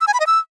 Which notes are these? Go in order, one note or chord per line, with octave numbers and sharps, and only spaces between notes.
E6
G#5
B5
D#5
E6